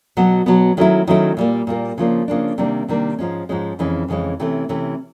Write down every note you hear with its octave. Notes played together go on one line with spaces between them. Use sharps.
B2 F#3 B3
B2 F#3 B3
D#3 F#3 A3 C#4 E4
D#3 F#3 A3 C#4 E4
A#2 G3 A#3
A#2 G3 A#3
C#3 F3 A#3 D4
C#3 F3 A#3 D4
C3 D#3 G3 A#3 D4
C3 D#3 G3 A#3 D4
G#2 F3 G#3 C#4
G#2 F3 G#3 C#4
F2 C#3 E3 G#3 C#4
F2 C#3 E3 G#3 C#4
C3 E3 A3 C#4
C3 E3 A3 C#4